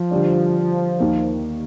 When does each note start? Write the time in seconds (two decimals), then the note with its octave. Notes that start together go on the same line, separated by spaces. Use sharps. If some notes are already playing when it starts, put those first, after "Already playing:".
Already playing: F3
0.11 D3 G3 D4
1.00 D#2 D#3 A#3